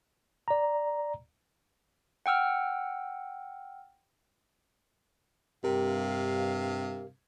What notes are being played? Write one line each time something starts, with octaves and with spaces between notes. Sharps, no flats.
D5 A#5
F#5 G5 E6 F6
G2 C3 G4 A#4 F5